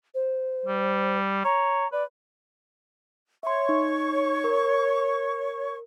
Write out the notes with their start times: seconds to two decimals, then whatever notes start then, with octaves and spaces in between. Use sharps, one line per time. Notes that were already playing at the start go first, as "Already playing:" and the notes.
0.14 C5
0.66 G3
1.45 C#5 A#5
1.92 B4 D5
3.43 C#5 E5 C6 C#6
3.69 D#4
4.44 A#4